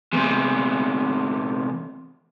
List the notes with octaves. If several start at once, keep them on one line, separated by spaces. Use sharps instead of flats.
E2 C3